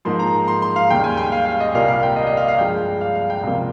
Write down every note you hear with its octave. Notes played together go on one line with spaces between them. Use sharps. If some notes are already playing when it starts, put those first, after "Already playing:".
G#2 F3 A#3 C6
A#5
C6
C6
F5
D#2 C#3 G3 G5
G#5
G5
F5
F5
D#5
C2 A#2 G3 A#3 F5
F5
G5
D#5
D#5
F5
F5
G2 F3 G#3 G5
F5
F5
G5
C#2 C3 F3 A#3 F5